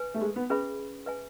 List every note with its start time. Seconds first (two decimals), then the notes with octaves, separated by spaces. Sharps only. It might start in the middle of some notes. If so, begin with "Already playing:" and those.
Already playing: B4 G#5
0.14 A3
0.21 G#3
0.36 B3
0.50 C#4 G#4 B4 E5 B5
1.06 B4 E5 G#5